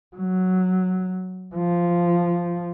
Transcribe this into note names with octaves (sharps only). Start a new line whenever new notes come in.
F#3
F3